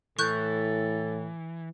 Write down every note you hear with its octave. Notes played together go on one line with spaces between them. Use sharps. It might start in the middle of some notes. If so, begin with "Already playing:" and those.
A2 E3 A4 C#6 F#6 G6